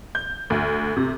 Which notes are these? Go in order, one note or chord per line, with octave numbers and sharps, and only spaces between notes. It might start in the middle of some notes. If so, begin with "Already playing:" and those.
G6
D2
C3